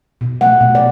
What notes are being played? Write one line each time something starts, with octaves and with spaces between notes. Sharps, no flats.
B2
A3 F#5
B2
D5